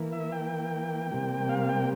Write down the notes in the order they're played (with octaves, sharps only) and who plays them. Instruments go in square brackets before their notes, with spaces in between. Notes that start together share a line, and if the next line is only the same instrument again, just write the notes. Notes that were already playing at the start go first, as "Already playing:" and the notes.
Already playing: [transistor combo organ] E3 A#3
E5
G5
C3 G3 A#3
F5
G5